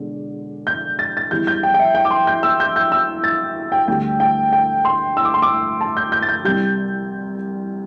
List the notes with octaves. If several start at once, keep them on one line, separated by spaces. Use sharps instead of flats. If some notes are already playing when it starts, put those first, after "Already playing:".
Already playing: E1 E2 D3
G6
A6
A6
E2 E3 G3 G6
G6
G5
G5
E5
G5
D6
C6
G6
E6
G6
G6
E6
A6
G5
D2 D3 G3 G5
G5
G5
C6
E6
D6
C6
D6
A5
G6
G6
A6
G6
C2 C3 G3 G6